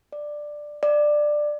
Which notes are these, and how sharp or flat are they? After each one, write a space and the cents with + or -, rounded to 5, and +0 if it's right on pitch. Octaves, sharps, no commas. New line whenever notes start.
D5 +10
D5 +15